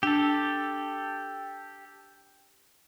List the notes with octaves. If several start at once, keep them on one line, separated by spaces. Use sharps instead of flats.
D4 G4 A4 E6